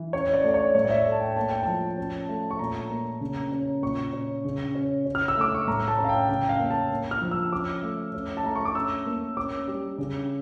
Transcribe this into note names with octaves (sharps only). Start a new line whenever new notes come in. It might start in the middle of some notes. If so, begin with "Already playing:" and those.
Already playing: E3
C#4 C#5
D5
A3 D5
C#5
A2 C#5
D5
E5
A3
A5
G5
A#3 A5
G5
F3 A5
C#4
A3
C#6
A#2 A#5
A#3
C#3
C#4
A#2 C#6
C#4
C#3
C#4
C#4
F6
E6
A3 D6
C#6
A2 A#5
A5
C#4
F5
G5
C#3 G5
F5
A#3
A5
A#3
F6
F3
E6
C#4 D6
A3
C#4
A5
A3 A#5
C#6
D6
C#4 E6
A#3
C#4 D6
G3
C#3